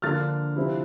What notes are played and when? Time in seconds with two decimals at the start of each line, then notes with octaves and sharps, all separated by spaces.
0.02 D3 F3 A#3 D4 F4 F6 A6
0.56 C3 F3 C4 E4